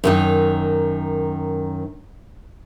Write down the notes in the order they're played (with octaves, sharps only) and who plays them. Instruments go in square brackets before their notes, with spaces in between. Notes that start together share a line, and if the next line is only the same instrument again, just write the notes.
[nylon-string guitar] F#2 D#3 D#4